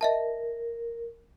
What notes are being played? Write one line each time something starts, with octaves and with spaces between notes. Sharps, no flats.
A#4 D#5 E5 A5